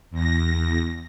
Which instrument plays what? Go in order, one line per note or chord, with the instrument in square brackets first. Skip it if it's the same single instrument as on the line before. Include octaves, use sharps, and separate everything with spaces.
[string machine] E2 A#6